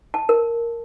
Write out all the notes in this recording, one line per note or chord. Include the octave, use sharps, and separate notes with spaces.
A5
A#4